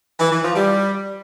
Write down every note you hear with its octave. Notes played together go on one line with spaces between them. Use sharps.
E3
E3
F3
G3